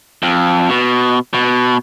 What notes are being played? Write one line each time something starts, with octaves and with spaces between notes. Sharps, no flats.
F2
B2
B2